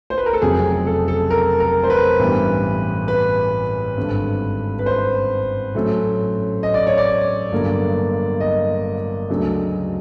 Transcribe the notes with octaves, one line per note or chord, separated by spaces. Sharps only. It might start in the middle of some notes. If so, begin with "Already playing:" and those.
C5
B4
A#4
A4
F1 F2 C#3 F#3 G#4
A4
A4
A#4
A#4
C5
B4
A1 G2 E3 G3 B3
B4
G#1 G2 D3
B4
C5
A2 F#3 A3 C#4
D#5
D5
C#5
D5
G1 G2 D3 F#3 A#3
D#5
D2 C#3 F#3 A3 D4